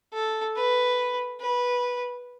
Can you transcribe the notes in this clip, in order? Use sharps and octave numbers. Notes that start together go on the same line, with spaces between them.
A4
B4
B4